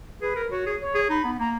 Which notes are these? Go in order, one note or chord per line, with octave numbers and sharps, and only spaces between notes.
G#4 B4
A#4
F#4 C#5
G#4
C#5
G#4
D#4 B5
B3
A#3 A#5